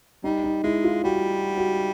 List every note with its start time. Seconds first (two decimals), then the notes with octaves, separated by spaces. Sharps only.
0.24 G3 D#4
0.43 D#4
0.64 G#3 E4
0.84 F4
1.04 G3 F#4
1.57 F#4